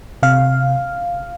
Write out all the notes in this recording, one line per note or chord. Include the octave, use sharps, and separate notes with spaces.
C3 F5